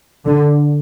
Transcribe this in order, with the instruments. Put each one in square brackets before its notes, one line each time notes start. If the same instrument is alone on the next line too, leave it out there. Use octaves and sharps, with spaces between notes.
[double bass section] D3